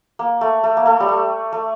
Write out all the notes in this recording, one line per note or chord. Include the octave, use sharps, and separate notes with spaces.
A#3
A3
A3
A#3
A3
G3
A3
A3